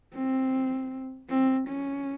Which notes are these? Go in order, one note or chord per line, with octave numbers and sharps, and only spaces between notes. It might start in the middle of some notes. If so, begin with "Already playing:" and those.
C4
C4
C#4